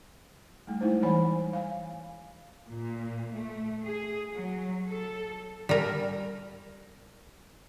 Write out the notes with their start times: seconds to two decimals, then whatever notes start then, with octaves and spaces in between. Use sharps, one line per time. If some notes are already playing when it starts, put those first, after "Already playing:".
0.67 G3 A3
0.81 G#3 A3 D#4 E4 C5
1.02 E3 G3 C5 C#5 G#5 B5
1.53 F5 G#5
2.68 A#2
3.33 A3
3.84 G#4
4.34 F#3
4.89 A4
5.69 G3 A#4